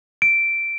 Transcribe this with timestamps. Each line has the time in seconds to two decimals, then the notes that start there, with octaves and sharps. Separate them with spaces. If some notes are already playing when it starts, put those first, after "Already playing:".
0.22 D7